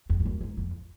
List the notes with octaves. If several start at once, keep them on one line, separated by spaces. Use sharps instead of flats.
F2
G#2
F#2
G#2
F2